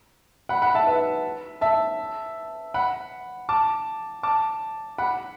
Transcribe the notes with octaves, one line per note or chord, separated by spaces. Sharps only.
F#5 B5
F#5 B5
E5 A5
B4 E5
E5 A5
F#5 B5
A5 D6
A5 D6
F#5 B5